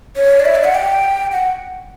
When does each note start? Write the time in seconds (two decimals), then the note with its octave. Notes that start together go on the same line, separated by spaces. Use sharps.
0.16 C#5
0.40 D5
0.45 E5
0.55 D5
0.64 F#5
0.75 G5
1.32 F#5